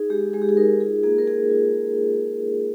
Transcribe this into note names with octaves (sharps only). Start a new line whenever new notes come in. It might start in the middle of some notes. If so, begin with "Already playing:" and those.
Already playing: D#4 G#4
G#3 G4
G#3 G#4
G4
G#4
D#4 A#4
F4 G#4
A#3 G#4
A#4
A#3 G#4
F4